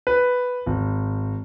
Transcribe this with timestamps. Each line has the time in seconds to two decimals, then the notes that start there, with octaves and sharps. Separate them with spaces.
0.07 B4
0.66 G#1